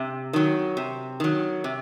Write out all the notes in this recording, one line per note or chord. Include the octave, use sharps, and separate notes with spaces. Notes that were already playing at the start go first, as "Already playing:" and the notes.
Already playing: C3
D#3 F#3
C3
D#3 F#3
C3